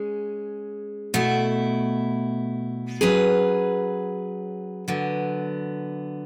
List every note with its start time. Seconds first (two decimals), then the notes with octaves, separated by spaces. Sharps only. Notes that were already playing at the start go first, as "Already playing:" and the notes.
Already playing: G#3 C#4 G#4
1.14 B2 A3 E4
3.01 F#3 C#4 G#4 B4
4.88 D3 F#3 B3